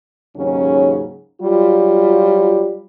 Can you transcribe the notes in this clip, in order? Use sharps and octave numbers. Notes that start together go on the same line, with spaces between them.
D#2 G#2 C#3 F#3 C#4
F#3 G3 F4